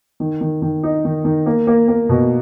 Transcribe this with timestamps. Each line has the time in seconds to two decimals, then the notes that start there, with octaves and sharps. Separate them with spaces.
0.20 D#3
0.41 D#3
0.62 D#3
0.83 D#4
1.05 D#3
1.25 D#3
1.46 A#3
1.67 A#3
1.88 A#3
2.09 B2